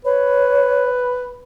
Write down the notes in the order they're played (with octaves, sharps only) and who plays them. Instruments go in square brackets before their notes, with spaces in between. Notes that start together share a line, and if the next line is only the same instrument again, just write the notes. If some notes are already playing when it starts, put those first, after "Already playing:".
[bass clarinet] B4 [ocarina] C#5